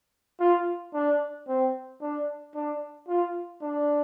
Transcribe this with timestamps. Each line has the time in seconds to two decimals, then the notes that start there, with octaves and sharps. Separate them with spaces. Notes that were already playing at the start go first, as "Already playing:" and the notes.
0.40 F4
0.94 D4
1.48 C4
2.02 D4
2.55 D4
3.08 F4
3.62 D4